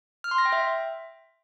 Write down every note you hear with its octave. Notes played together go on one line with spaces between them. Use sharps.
F6
C6
A#6
G5
E5